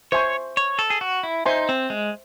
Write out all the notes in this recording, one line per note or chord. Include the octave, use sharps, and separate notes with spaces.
C5 C#5 E5 G#5 C#6
C#5
A4
G#4
F#4
E4
D#4 C5 E5 G#5 C6
C4
G#3